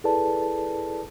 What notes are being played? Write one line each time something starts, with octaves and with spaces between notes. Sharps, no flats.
E4 G#4 A4 B4 D5 A5